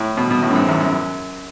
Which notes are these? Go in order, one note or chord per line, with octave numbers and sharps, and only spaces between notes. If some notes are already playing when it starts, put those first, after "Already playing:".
Already playing: A2
B2
B2
A2
F#2
G#2
E2
F#2